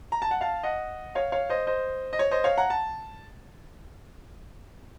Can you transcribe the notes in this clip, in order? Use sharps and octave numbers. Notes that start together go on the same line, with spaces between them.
A#5
A5
F#5
F5 A5
D#5 F#5
C#5 F5
C#5 F5
C5 D#5
C5 D#5
D#5
C#5
C5 D#5
C#5 F5
F#5 A#5
A5